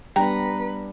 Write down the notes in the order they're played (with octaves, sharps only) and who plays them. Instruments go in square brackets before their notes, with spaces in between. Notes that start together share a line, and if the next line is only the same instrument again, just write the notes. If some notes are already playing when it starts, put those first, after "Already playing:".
[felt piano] G3 D4 [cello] B3 B4 [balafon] G5 [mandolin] A#5